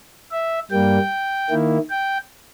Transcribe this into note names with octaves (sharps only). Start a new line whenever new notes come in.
E5
G2 G3 A#3 G5
D#3 A#3 E4
G5